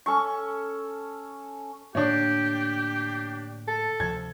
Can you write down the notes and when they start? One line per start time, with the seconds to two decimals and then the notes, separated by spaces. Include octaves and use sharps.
0.06 C#4 A4 C#6
1.95 A2 D3 A#3 D4 G4 C#5
3.68 A4
4.00 D2 C3 F3 G#6